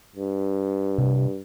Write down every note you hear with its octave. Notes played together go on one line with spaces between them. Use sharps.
G2
C3